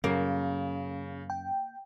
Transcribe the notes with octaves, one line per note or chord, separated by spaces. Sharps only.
F#2 C#3 A#3
G5